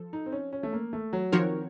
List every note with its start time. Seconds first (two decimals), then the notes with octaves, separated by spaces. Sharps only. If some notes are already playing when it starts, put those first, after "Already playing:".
Already playing: F3 A4
0.13 D#4
0.26 C4
0.32 C#4
0.53 C#4
0.63 A3
0.73 A#3
0.93 A3
1.13 F#3
1.32 D#3 F3 C4 F#4 A#4 C#5